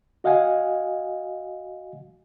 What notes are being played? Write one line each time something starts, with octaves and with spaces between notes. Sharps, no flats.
F#4 D#5 F5 F#5 G#5